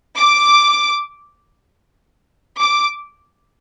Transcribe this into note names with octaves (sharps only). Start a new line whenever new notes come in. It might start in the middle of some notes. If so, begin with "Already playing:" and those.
D6
D6